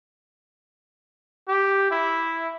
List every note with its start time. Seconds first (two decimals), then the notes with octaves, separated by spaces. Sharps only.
1.48 G4
1.91 E4